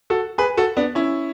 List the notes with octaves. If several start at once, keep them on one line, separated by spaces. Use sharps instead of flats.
F#4 A4
G#4 B4
F#4 A4
B3 D4
C#4 E4